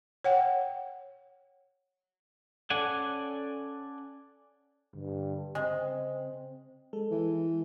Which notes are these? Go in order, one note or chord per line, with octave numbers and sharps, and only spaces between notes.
C#5 F#5 G5
C#4 A4 D5 F#5 G#5
G2 D3
C#3 G#3 C4
G#3 A4
E3